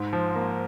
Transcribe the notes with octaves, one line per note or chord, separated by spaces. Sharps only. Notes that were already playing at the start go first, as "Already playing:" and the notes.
Already playing: G#2
F3
A#3